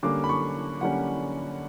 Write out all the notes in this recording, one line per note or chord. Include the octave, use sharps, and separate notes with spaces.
D3 G3 A#3 C#4 D6
B5
C#6
D3 G3 A#3 C#4 F#5